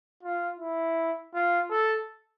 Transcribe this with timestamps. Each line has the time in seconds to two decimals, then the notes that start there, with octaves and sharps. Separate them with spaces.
0.23 F4
0.59 E4
1.34 F4
1.71 A4